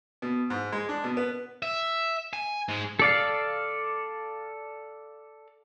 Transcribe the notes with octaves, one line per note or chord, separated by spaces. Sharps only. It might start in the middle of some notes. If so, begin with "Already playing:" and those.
B2
G#2
G#3
D4
B2
B3
E5
G#5
G#2 G#3
A4 D5 F5